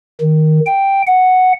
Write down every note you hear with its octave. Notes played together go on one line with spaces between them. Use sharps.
D#3
G5
F#5